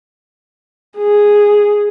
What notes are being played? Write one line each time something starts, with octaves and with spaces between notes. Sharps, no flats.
G#4